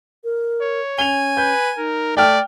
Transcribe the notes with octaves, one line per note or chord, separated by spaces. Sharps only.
A#4
C#5
C#4 G#5 F7 G7
B4 G6
D#4 A#4
A3 D5 G5 F6